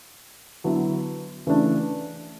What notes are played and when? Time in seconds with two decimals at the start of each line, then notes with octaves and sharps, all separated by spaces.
0.64 D3 F#3 B3 E4
1.47 C#3 E3 A3 D4